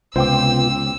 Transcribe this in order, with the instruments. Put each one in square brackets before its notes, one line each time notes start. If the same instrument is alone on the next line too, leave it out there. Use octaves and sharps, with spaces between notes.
[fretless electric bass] C#2 [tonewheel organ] C3 B3 F4 [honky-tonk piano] C5 G5 D6 [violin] E6